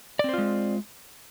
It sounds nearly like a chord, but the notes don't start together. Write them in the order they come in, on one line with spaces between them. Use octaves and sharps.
D5 C4 C5 F4 G#3